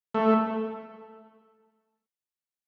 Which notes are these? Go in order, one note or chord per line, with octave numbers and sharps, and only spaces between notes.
A3